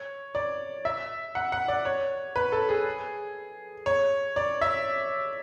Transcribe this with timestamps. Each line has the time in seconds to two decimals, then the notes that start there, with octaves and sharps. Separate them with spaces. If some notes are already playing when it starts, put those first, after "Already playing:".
Already playing: C#5
0.35 D5
0.85 E5
1.35 F#5
1.52 F#5
1.68 D5
1.85 C#5
2.36 B4
2.52 A4
2.69 G#4
3.86 C#5
4.36 D5
4.61 E5